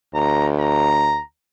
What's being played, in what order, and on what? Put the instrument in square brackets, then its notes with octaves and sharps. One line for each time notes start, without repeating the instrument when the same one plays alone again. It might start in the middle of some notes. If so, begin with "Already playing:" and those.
[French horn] D2 [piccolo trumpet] A#5
[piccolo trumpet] A#5